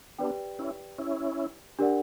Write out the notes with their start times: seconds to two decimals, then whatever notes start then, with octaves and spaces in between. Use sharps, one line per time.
0.19 B3 D4 G4 B4 D5 G5
0.59 C#4 E4
0.98 C#4 E4
1.79 D4 G4 A#4 D5 F#5